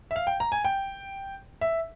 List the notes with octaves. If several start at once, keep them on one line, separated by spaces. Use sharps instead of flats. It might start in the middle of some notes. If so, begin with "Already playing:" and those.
E5
F5
G5
A#5
G#5
G5
E5